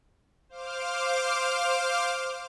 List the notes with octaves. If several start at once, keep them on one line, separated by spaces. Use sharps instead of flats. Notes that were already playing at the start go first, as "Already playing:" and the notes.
C5 F5 D6 F6